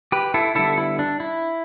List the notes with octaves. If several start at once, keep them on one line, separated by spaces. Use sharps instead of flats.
G4 B4
E4 A4
D3 G3 B3 E4 A4
E4
D4
E4